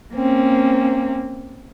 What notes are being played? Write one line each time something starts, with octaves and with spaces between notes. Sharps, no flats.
A#3 C4 C#4